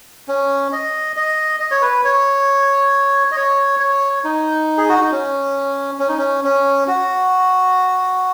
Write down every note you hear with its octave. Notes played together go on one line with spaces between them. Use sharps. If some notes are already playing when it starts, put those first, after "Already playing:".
C#4
D#5
D#5
D#5
C#5
B4
C#5
D#5
C#5
C#5
D#4
G#4
F#4
D#4
C#4
C#4
D#4
C#4
C#4
F#4